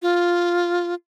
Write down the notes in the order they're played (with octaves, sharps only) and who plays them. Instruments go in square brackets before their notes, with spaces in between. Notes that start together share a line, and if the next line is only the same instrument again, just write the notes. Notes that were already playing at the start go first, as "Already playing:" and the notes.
[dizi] F4